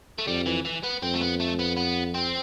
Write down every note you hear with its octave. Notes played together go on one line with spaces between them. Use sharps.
A3
F2 G3
E3
E3
B3
F2 C4
A3
B3
A3
B3
B3
C4